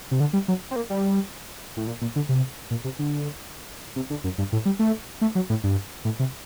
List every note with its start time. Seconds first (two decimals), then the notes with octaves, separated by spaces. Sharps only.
0.11 C3
0.20 D3
0.33 G3
0.48 F#3
0.71 C4
0.76 A#3
0.90 G3
1.77 A2
1.87 A#2
2.01 A#2
2.16 D3
2.29 C3
2.71 A#2
2.84 C3
2.99 D3
3.96 C3
4.10 D3
4.24 F#2
4.38 G2
4.52 A2
4.65 G3
4.79 A3
5.21 A3
5.35 F#3
5.50 A2
5.64 G2
6.05 A2
6.19 C3